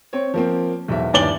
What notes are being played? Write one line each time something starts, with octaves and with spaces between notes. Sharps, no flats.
C4 C#5
F3 A#3 C4
B1 E2 E5
G1 D#2 E4 D5 F#7 G7